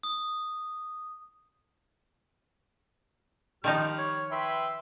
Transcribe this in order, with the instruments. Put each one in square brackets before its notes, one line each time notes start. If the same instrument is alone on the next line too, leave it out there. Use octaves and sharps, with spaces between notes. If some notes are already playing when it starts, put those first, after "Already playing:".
[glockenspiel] D#6
[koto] D#3 F3 D#4 [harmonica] G3 F6
[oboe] C#5
[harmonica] B4 G5 C6 [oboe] E5